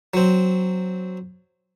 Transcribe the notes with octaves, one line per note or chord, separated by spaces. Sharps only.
F#3 C4